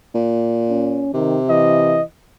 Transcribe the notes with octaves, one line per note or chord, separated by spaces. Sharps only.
A#2
C#4
C3 D#3
E3 D#5